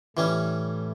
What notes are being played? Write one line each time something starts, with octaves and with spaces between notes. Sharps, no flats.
A2 E3 G3 A3 C#4